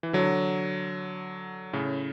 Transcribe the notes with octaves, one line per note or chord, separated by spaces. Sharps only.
E3
D3 F#3
A2 C#3